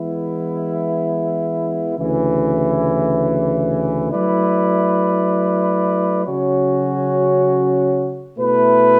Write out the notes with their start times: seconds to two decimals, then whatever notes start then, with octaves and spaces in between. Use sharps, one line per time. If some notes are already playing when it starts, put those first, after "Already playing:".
Already playing: E3 G#3 B3 E4
1.97 D2 C#3 E3
4.11 F#3 A3 E4 B4 D5
6.24 C#3 F#3 C#4 F#4 C#5
8.38 B2 A3 E4 B4